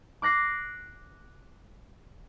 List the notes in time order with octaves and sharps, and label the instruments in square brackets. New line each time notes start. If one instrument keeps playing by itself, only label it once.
[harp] D6 F#6 A#6 C7